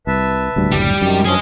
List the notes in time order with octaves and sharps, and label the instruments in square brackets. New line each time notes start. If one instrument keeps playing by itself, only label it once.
[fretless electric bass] C2 [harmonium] B4 E5 A5
[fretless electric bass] D#1 D2 G3
[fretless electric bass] F#1 D2 A2 [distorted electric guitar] G3
[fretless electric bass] F#2 [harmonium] C3 D#3
[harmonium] G2 F3 C#4 [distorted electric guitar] G#4 D#5